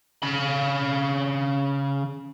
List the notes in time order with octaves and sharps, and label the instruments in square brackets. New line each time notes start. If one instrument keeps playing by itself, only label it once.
[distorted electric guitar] C#3 B5